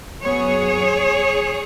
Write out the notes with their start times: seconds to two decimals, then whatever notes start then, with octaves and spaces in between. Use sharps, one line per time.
0.22 F#2 F#3 B3 G#4 C#5